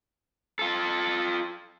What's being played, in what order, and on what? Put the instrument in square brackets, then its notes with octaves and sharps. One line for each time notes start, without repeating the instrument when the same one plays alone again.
[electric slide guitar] F4 A4